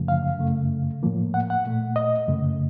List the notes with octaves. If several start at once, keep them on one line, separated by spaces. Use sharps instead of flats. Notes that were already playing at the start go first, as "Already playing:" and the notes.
Already playing: F#2 C#3 F3 A3
F5
F#2 C#3 A3
A2 F3 A#3
F#5
F#5
A#2 A3
D#5
F#2 C#3 A3